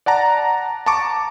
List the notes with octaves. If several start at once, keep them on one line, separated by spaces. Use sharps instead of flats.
D5 F#5 A5 A#5
A5 A#5 C#6 D6